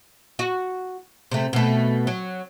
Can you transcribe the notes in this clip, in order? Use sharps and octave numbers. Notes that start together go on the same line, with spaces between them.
F#4
C3 A3
B2 A3
F#3